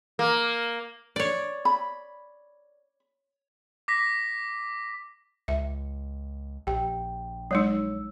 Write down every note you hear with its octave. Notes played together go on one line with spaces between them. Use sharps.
A#3
C#5 D5
B5
D6 A#6 B6
C#2 E5
A#1 G4 G5
F#3 G#3 D#4 C#5 E6